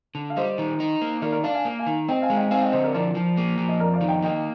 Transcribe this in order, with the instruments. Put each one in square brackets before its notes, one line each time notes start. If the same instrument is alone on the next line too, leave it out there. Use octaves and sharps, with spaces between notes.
[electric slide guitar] D3
[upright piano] F5
[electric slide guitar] G3 [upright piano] C5 D#5
[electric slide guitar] D#3
D#4
A#3
[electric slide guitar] D#3 [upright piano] A#4 D5
[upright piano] A#4 D5
[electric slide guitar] D4 [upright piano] D5 F5
[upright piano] F5 G#5
[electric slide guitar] A#3
[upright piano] F5 G#5
[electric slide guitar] D#3
[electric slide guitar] C4 [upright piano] D#5 G5
[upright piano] F5 G#5
[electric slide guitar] G#3
[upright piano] D#5 G5
[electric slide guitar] C4 [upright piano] F5 G#5
[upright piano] D#5 G5
[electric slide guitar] D3 [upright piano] C5 D#5
[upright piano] A#4 D5
[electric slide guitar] F3 [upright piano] A#4 D5
[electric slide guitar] F3
A#3
F3
[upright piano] D#5
[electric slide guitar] F2 [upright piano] A#4 D5
[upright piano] D5 F5
[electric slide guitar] D#3
[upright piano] D#5 G5
[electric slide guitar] A#3 [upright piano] D#5 G5